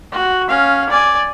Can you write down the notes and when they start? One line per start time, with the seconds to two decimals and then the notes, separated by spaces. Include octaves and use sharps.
0.12 F#4
0.48 C#4 F5
0.90 D5 G#5